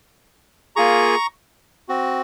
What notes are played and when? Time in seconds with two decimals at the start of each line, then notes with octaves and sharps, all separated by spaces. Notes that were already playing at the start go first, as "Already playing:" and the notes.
0.76 A#3 F4 G#4 A#5 C#6
1.89 C4 F#4